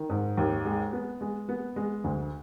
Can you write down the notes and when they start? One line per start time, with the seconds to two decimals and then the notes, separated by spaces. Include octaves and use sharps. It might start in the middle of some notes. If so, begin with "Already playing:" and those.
Already playing: D#3
0.10 G#2
0.38 D#2
0.65 G#3
0.93 B3
1.21 G#3
1.49 B3
1.76 G#3
2.04 D2